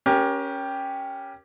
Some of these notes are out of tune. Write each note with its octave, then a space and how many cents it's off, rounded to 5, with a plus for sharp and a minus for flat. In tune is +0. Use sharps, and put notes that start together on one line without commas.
C#4 +0 G4 +0 A#4 +30